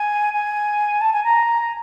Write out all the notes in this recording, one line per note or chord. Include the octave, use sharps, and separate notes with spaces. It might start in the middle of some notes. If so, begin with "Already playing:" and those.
Already playing: G#5
G#5
A5
G#5
A#5